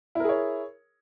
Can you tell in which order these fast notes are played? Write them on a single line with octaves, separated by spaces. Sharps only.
E4 A#4 G#4 C#5